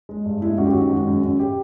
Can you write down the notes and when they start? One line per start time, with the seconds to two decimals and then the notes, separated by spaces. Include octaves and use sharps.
0.09 G#3
0.26 G2
0.41 G#3 E4
0.58 F#2 F#4
0.66 G4
0.72 D#3 F#4
0.91 G#3
1.07 F#2
1.22 F#2
1.39 G4